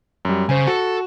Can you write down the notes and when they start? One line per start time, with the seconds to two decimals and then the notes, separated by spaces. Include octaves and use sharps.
0.25 F#2 G3
0.49 C#3 C5 G#5
0.67 F#4 A4